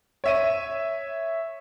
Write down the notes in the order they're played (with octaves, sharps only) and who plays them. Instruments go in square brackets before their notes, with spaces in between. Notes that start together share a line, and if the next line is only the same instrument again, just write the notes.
[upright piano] C#5 E5 D#7